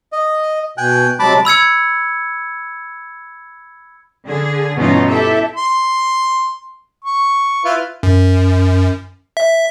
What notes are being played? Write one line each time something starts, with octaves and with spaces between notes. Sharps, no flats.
D#5
B2 G5 G#5 F#6
C3 F#3 G#3 A5 B5 D6
B5 E6 G#6 C#7
D3 G#4
G2 B2 E3 C#4 D#4 F4
E4 G4 A4 E5
C6
C#6
E4 F4 B4
F#2
E5